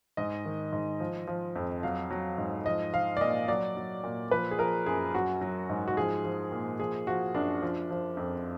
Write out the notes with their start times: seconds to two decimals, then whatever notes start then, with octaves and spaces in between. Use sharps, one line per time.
0.17 G#2 D#5
0.45 D#3
0.73 G#2
1.00 F3
1.27 F3
1.56 F2
1.83 F#3 F5
2.10 F#3
2.38 G#2
2.66 F3 D#5
2.93 F3 F5
3.17 D5
3.21 A#2 D#5
3.48 F#3 D5
3.77 F#3
4.04 A#2
4.31 F3 B4
4.51 G#4
4.59 F3 A#4
4.86 F#2 G#4
5.14 F#3 F#4
5.41 F#3
5.69 G#2
5.88 F#4
5.97 F3 G#4
6.24 F3
6.52 A#2
6.80 F3 G#4
7.07 F3 F#4
7.34 F#2 D4
7.62 F3
7.91 F3
8.17 F2